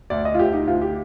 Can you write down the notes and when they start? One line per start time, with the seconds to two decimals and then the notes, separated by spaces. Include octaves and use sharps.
0.10 D2 D5
0.25 D#5
0.34 F4
0.39 D2 G4
0.54 D#4
0.67 D2 F4
0.82 G4